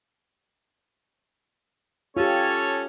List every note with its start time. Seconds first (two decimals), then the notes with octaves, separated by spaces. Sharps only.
2.17 C#4 F4 G4 A4 C#5